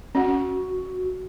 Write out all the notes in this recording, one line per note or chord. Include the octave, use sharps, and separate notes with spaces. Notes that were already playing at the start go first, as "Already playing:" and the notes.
C#4 F#4 F#5